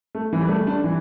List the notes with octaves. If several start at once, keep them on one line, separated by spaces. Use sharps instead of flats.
A3
E3
G3
A3
D4
E3